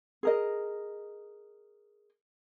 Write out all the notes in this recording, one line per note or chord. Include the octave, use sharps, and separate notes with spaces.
G#4 A#4 D#5